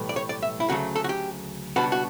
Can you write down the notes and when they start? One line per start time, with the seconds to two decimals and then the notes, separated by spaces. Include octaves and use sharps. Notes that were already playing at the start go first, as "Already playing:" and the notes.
Already playing: B1 A2 E3 G3 B3
0.09 D5
0.16 C#5
0.29 D5
0.43 E5
0.60 E4
0.68 D2 C#3 F#3 A3 F#4
0.96 A4
1.04 F#4
1.09 G4
1.76 C#2 B2 G3 B3 D4 F#4
1.92 F#4